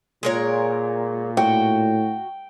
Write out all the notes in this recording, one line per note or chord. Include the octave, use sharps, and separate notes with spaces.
A#2 G#3 A#4 C#5
A2 F#4 G5